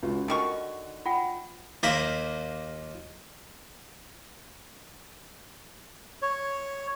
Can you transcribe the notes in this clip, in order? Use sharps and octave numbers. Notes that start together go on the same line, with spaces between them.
C#2 F4 F#4
D3 D#3 D#4 F#4 C#6
F4 F#5 G5
D#2 A#3 A#4 C5 B5
C#5